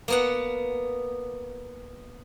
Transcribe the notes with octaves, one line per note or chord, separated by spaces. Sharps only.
A#3 B3 F#5